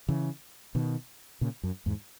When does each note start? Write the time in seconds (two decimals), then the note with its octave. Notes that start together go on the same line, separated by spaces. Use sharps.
0.09 C#3 E3
0.75 B2 D#3
1.41 A#2 C#3
1.63 F#2
1.86 E2 G#2